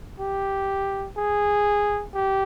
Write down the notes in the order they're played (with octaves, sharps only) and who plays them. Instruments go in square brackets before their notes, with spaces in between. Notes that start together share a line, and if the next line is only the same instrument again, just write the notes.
[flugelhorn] G4
G#4
G4